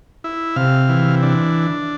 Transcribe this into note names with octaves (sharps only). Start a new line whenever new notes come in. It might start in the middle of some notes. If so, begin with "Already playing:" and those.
E4
C3 F5
E3
D4